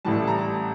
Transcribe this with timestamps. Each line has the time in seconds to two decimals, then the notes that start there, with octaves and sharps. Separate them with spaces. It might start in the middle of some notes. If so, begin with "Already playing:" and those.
0.05 A1 A2 E3 G3 A5
0.27 A#5